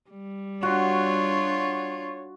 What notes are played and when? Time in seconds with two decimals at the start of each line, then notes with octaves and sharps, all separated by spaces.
0.10 G3
0.63 D4 F4 F#4 C#5